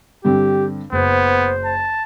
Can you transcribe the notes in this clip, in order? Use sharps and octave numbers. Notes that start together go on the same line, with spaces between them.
G2 D3 C4 G4
F#1 B3 C5
A5